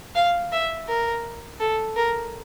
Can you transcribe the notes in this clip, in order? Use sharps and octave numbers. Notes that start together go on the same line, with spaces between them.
F5
E5
A#4
A4
A#4